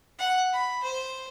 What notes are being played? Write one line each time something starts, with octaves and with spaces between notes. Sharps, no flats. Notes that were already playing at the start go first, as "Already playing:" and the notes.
F#5
B5
C5